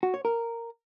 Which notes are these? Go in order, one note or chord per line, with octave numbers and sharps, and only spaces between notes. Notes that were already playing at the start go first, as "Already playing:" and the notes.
F#4
C#5
A#4